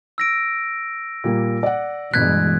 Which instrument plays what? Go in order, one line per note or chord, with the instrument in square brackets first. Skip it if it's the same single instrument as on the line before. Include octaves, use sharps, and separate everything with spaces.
[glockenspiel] E6 A#6 D7
[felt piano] A#2 G3 A#3
D5 F#5
[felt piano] G1 B6 [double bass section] B2 E3 G#3 [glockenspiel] F#6 G#6